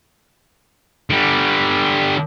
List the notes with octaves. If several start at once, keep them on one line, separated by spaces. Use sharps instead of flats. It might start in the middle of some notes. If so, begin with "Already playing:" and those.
D3 G3